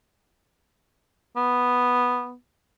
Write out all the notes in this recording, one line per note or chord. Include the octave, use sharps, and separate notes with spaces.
B3